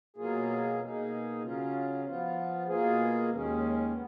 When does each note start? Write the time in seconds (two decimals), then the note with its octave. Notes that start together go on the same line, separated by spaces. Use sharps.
0.17 B2 F#3 A#3 F4 G#4
0.80 B2 A#3 D#4 G#4
1.42 C#3 F#3 C#4 F4
2.05 F3 B3 F4
2.67 B2 A#3 F4 G#4
3.30 D#2 D#3 G#3 C#4
3.92 B3